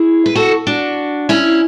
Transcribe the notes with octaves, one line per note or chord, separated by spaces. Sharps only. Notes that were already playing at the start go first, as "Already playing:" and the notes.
Already playing: E4 G#4
B4
F#4 A4
D4 F#4
C#4 E4